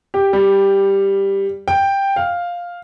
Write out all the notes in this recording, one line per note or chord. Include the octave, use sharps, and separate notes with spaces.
G4
G3
G5
F5